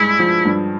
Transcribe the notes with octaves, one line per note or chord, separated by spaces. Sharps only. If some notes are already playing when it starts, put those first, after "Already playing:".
Already playing: G2 G#3 E4
F3
G2